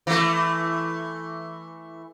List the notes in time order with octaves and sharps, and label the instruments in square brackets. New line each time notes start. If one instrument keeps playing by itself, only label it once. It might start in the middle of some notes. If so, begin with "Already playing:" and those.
[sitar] E3 A3